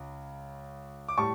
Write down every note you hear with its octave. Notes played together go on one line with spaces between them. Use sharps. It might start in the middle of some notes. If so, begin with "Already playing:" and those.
Already playing: C#2 C#3
D6
A2 G3 A5 C#6